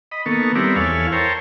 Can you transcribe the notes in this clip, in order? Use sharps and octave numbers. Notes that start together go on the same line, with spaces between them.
D#5 B5
D#3 A#3 B3 A4 C#6
G3 B3 C4 E4 A#4 D5
E2 E4 A4 C#5 F5 G#5
A#4 C5 C#5 G5 A5